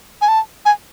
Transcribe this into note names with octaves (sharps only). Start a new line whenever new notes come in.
G#5
A5
G#5